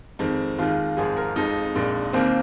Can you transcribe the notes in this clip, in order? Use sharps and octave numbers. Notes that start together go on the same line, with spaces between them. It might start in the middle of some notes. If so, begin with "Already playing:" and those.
F2 D#3 G#3 C4
D#2 D#3 G#3 F4
G#1 G#2 F3 G#3 G#4
A#4
F2 F3 G#3 D#4
A#1 A#2 G#3
D#2 D#3 A#3 C4